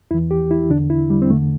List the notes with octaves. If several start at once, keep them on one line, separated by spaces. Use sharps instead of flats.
E2 E3 E4
G4
E4
E2 D3 D4
E4
G3
C4
E2 D3 A3